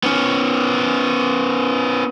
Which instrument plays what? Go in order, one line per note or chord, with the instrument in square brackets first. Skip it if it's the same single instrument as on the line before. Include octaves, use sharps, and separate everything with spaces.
[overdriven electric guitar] B3 C#4